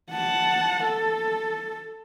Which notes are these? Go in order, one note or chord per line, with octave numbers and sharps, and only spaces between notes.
F#5 A5
A4